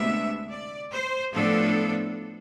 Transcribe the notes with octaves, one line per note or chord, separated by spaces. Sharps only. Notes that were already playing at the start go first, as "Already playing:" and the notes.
Already playing: D2 C3 G#3 B3 D4 E5
D5
C5
A2 F3 B3 D4 A4